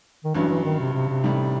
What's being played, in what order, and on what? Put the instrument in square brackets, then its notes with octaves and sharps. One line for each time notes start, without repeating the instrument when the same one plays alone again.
[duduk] D#3
[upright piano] A1 G2 F#3 [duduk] E3
[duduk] E3
D#3
C3
C3
C3
[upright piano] A1 A2 G3 D#4